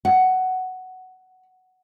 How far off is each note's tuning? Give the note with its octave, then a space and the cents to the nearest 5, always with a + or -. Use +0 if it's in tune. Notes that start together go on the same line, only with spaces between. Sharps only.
F#5 +10